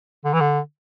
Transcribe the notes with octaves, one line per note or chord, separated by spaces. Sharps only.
D3
E3
D3